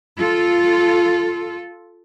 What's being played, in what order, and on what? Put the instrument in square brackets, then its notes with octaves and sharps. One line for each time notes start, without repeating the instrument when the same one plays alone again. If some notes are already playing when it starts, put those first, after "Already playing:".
[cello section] F4 A4